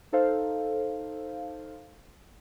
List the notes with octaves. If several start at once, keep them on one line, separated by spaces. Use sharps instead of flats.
D#4 A4 C5 F5